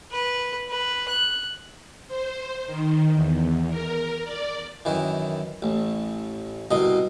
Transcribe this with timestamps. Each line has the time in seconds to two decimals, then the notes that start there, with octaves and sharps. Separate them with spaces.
0.11 B4
0.69 B4
1.09 F#6
2.08 C5
2.66 D#3
3.13 E2
3.70 A#4
4.24 D5
4.85 F#2 D#3 E3
5.62 A1
6.71 C2 B2 D#5